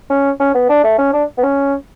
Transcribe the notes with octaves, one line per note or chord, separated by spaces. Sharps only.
C#4
C#4
B3
D4
A3
C#4
D4
B3
C#4